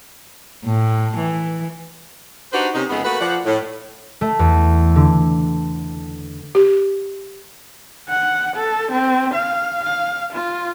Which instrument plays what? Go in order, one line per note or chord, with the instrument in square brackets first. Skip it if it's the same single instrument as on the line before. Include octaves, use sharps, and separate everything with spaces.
[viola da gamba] A2
E3
[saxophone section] D4 D#4 F#4 G4 B4 C5
C3 C#4 D#4
F2 C#3 G#3 A3 B3
A3 A#3 F#4 B4
F3 D5 F#5
A2
[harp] A3
E2
D3
[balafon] G4
[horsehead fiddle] F#5
A4
C4
F5
F5
F4